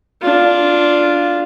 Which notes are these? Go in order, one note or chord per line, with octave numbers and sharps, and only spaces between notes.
D4 F4